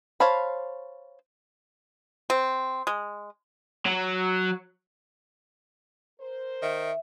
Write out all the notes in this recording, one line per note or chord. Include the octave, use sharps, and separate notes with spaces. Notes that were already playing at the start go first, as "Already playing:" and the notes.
C5 C#5 F5 A5 B5
C4
G#3
F#3
A#4 C5
D#3 E5